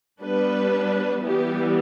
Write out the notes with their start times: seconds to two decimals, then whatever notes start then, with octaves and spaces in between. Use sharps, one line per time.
0.21 G3 B3 D4 B4
1.23 E3 G3 B3 G4